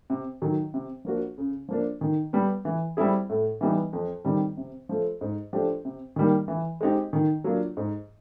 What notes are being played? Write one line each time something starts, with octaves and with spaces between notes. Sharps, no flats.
C3
D#3 F#3
C3
F3 A#3 D4 F#4
C#3
F3 A#3 D4
D#3
G3 B3
E3
G3 C4 E4 G#4
A2
E3 G3 B3 D#4
F2
C3 D#3 G3
C3
F3 A3
G#2
F3 A3 D4 G4
C3
D#3 G3 A#3
E3
G#3 C4 D#4 G4
D#3
F#3 A#3 D4 F4
G#2